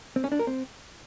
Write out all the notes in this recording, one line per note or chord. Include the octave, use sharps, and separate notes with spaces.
C4
C#4
D4
A#4
C4